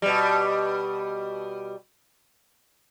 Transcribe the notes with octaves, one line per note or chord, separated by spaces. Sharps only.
B2 G3